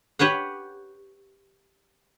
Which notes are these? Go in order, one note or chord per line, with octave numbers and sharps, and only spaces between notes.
G4 B4 C#5 F#5